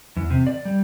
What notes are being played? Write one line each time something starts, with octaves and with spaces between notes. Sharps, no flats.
E2
C3
D5
G3